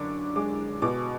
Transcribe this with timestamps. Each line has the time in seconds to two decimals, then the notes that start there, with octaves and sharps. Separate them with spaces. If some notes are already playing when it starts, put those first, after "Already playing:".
Already playing: F#2 D3 D4 C#6 D6
0.36 G#3 D6
0.82 B2 D6